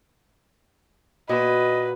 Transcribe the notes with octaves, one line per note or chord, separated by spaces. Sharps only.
A#2 F#4 B4 D#5